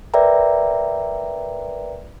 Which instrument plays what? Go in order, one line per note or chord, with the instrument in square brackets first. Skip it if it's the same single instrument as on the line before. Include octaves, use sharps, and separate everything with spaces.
[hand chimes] A#4 B4 D5 E5 G5 A#5